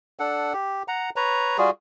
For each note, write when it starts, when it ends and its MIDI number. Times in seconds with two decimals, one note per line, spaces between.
0.19 0.53 62
0.19 0.53 69
0.19 0.53 78
0.53 0.83 67
0.88 1.10 78
0.88 1.10 82
1.16 1.57 71
1.16 1.57 73
1.16 1.57 82
1.58 1.70 55
1.58 1.70 65
1.58 1.70 66
1.58 1.70 68